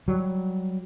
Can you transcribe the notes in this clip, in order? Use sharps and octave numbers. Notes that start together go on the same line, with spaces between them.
F#3 G3